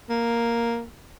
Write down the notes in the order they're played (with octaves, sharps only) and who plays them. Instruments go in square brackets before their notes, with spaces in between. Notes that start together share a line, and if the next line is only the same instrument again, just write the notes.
[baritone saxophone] A#3